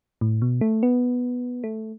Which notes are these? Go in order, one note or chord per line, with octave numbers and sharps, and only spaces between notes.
A2
B2
A3
B3
A3